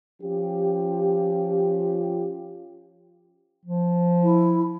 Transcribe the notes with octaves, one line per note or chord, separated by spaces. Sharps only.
F3 C#4 F4 G4
F3
E4